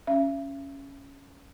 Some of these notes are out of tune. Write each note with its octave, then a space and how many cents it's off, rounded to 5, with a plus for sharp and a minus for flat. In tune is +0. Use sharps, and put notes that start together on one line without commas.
C#4 +0 E5 +45